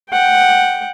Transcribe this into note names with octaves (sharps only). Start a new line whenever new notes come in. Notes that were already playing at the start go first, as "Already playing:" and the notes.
F#5 G5